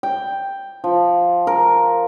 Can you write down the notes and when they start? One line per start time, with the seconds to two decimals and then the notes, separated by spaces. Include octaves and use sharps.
0.03 G5
0.84 F3
1.47 A#4